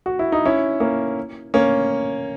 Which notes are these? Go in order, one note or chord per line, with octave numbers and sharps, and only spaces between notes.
F#4
E4
D#4
C#4 E4
A#3 C#4
A#3 C#4